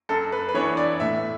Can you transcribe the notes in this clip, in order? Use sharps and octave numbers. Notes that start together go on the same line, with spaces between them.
F#2 A4
B4
B4
E3 B3 D4 C#5
D5
A2 E5